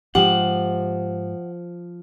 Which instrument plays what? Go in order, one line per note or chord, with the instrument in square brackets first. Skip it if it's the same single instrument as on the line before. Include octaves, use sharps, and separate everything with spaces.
[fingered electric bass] G#2 G#3 D4 [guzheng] F3 [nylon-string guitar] G4 [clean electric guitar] F#5